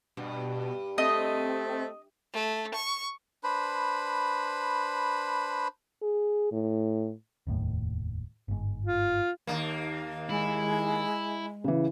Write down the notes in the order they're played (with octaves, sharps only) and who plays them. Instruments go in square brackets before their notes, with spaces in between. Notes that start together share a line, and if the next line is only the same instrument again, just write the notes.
[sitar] G2 [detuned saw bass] B2
[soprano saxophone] A3 [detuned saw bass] C4 [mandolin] D#5
[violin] A3
C#6
[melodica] D4 B4 C5 B5
[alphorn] G#4
A2
[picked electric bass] F1 D#2 A2
G1 G#2
[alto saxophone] F4
[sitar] D#2 A2 A#3
[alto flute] G#3 [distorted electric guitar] E4
[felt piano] C#3 E3